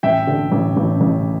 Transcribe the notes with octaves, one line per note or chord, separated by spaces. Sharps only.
A1 E5 G5
D3
A1
A1
A1